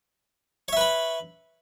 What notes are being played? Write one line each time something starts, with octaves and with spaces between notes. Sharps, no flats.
B4 C#5 E5 B5